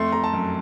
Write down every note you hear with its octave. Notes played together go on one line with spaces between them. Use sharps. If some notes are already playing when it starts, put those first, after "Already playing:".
Already playing: F2 A3 C6
A3 A#5
A5
F#2